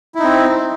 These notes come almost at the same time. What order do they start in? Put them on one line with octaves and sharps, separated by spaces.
E4 D#4 C4